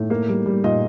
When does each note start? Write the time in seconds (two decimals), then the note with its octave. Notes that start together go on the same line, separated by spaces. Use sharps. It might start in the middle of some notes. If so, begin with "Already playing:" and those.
Already playing: A2
0.10 A#3
0.28 G3
0.46 G3
0.64 A#2 D#5